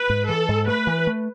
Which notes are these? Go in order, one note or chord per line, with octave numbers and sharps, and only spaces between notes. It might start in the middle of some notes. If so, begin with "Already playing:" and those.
Already playing: B4
G#2
E3 A4
G#2
A3 B4
E3
A3